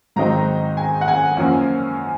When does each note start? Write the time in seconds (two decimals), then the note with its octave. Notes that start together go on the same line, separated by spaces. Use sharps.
0.16 G#2 D#3 F#3 C4 D#4 A#5
0.77 G#5
1.01 F#5
1.08 G#5
1.37 F#2 F3 A#3 C#4